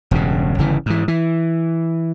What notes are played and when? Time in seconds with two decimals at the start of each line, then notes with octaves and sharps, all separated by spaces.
0.11 E1 G2 C#3
0.58 G1 C#3 E3
0.86 G#2 E3
1.08 E3